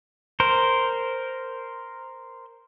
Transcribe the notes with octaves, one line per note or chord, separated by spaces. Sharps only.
A#4 C5